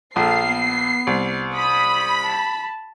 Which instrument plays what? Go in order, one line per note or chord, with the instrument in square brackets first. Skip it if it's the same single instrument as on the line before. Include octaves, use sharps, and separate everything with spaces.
[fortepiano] A#1 [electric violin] A4 F5 [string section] C7
[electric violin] B3
[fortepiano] C2
[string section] B5 [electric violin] D#6
[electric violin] A5